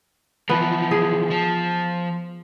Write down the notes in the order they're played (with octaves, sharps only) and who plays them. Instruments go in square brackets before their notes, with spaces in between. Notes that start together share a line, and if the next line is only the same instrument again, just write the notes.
[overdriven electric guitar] E3 F3 [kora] B3
[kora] G#4
[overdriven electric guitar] F3